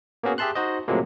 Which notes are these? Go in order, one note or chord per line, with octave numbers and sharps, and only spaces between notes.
A#3 B3 C#4 F#4 G#4
G4 G#4 E5 A5 C6 F#6
D#4 F#4 C5 D#5
A2 C3 F3 F#3 G#3 A#3